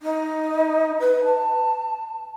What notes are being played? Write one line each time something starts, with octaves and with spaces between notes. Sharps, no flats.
D#4
B4
A5